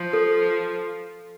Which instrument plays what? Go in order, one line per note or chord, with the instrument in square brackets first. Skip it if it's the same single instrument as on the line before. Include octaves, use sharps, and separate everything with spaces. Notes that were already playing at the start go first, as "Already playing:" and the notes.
Already playing: [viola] F3
[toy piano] A4